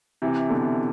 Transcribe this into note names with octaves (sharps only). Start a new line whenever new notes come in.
C3 E3
B2 D3